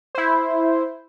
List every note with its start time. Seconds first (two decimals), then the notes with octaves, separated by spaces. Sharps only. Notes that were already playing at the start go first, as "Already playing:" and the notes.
0.15 E4 C5